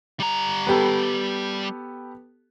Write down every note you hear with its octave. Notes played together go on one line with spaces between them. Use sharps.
G3 A#5
B3 G4 A4